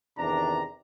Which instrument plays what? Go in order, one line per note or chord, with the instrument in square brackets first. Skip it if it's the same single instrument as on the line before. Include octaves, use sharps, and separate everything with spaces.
[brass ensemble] E2 C3 D#3 D4 D5 A#5